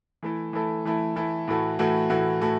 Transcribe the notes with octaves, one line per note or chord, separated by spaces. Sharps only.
E3 A3 E4 A4
E3 A3 E4 A4
E3 A3 E4 A4
E3 A3 E4 A4
A2 E3 A3 F#4 A4
A2 E3 A3 F#4 A4
A2 E3 A3 F#4 A4
A2 E3 A3 F#4 A4